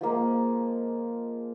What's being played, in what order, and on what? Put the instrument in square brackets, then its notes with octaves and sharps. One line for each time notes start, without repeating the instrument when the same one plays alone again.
[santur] F3 G#3 A#3